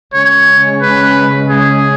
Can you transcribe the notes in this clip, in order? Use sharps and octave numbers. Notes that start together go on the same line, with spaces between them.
C#3 G#3 C#4 C#5
B4
G#4